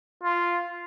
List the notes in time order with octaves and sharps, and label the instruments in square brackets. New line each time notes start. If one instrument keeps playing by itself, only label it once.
[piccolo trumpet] F4